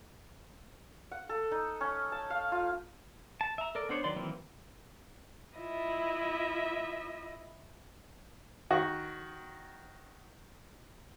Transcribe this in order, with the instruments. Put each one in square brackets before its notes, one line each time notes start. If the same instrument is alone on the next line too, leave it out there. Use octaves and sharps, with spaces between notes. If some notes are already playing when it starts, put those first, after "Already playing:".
[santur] F#5
A4
D#4
C#4
A5
F5
F4
[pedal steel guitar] A5
E5 A#5
A4 A#4 D5
B3 D4 C5 C#5
D#3 F#3 D5 C6
D#3 E3 F#3 A#3 C4
[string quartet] E4 F4 D#5 E5
[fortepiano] D#3 F#4